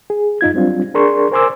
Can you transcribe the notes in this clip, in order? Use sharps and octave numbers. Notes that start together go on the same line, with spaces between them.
G#4
F#2 D#4 F4 G#6
F#3 G3 C4 D4 F4
D4 G#4 A#4 D5 C6 C#6
A#4 C5 G#5 C6 D6 E6